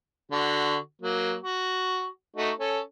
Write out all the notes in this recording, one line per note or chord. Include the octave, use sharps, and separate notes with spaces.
D3 F#4
F#3 A#3
F#4
A3 D#4 F#4
C#4 A4